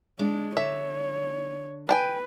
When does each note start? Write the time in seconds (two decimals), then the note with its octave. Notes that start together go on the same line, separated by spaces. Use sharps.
0.19 G#3 D4
0.57 D3 C#5 E5
1.89 D4 B4 G5 G#5